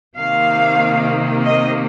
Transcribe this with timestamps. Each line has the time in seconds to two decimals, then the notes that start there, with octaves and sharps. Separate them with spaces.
0.18 C3 D#3 A#3 F5
1.44 D#5